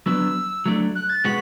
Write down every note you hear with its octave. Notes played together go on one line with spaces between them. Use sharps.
F#3 B3 D4 E6
F#3 A3 D4
F#6
A6
B2 G#3 B3 F#4 B6